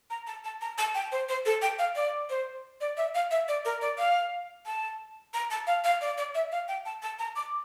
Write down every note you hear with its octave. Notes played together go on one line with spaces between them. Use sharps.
A#5
A5
A5
A#5
A5
G5
C5
C5
A4
G5
F5
D5
C5
D5
E5
F5
E5
D5
A#4
D5
F5
A5
A#5
A5
F5
F5
D5
D5
E5
F5
G5
A5
A5
A#5
D6